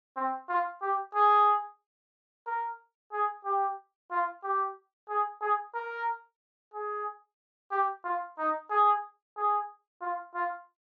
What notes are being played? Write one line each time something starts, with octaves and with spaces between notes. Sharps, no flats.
C4
F4
G4
G#4
A#4
G#4
G4
F4
G4
G#4
G#4
A#4
G#4
G4
F4
D#4
G#4
G#4
F4
F4